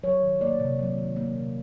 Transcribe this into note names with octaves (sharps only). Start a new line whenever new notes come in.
F#3 C#5
D#3
A#3 D5
C3
F#3
D#3
A#3
C3